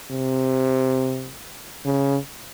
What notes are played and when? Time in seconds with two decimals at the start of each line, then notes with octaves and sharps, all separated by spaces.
0.11 C3
1.86 C#3